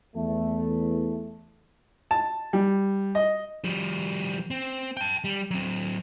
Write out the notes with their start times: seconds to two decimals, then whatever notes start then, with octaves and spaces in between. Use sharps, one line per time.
0.14 E2 A3
2.11 A5
2.53 G3
3.15 D#5
3.64 F3 G3
4.50 C4
4.97 G5 A5
5.24 G3
5.51 F#3 C4